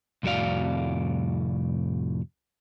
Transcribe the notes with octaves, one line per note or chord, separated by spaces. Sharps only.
C2 F2 A2 F#4 D5 F5